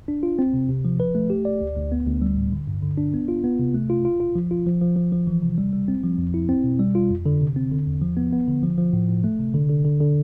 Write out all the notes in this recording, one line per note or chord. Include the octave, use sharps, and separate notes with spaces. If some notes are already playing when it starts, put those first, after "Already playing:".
D4
F4
C4
C3
C3
F3
B4
A3
G4
D5
D2
D2
B3
D2
G3
A2
D3
G2
D3
D4
B3
F4
B3
C3
A3
F4
F4
F4
F3
F4
F3
F3
F3
F3
E3
C3
G3
G3
C4
F3
F2
E4
C4
B2
G3
F4
F2
D3
C3
C4
D3
E2
F3
B3
B3
D3
F3
F3
A2
A2
A3
C3
D3
D3
D3
D3